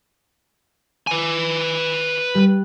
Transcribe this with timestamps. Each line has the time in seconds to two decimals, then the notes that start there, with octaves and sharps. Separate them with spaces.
1.07 B4 G#5
2.35 G3 F#6